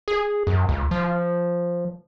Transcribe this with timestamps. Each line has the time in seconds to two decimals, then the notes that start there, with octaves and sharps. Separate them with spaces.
0.08 G#4
0.47 F#2
0.69 C#2
0.91 F3